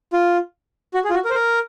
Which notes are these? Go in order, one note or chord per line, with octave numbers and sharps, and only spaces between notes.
F4
F#4
G#4
F4
F#4
A#4
C5
A#4